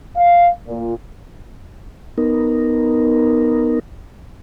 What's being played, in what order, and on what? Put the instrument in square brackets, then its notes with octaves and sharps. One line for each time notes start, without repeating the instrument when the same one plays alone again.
[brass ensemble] F5
A#2
[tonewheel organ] B3 D#4 A#4